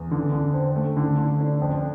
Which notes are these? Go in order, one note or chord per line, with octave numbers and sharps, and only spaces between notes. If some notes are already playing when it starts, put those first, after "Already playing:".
Already playing: E2
D3
D3
C4
A3
D3
D3
D4
F2